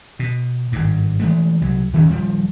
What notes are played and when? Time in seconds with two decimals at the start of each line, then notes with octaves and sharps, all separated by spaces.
0.19 B2
0.72 G#1 G2
1.20 E3 G#3 A3
1.61 C2 F#3
1.93 D#2 D#3 E3 C#4
2.10 D#1 F3 G3